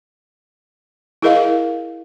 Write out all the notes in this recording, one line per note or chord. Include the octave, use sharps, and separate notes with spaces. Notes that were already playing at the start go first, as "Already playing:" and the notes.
E4 G#4 A#4 D#5 F5